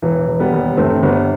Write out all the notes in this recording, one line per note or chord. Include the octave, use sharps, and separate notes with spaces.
E1 E3
E1
G3 B3
D#2
G1 A3 C4
G1 G3 B3